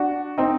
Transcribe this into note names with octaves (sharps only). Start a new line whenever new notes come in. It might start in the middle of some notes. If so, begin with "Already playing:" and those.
Already playing: D4 F#4
C4 D#4